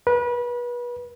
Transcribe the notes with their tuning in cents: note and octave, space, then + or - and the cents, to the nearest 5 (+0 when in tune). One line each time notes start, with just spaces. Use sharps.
B4 -30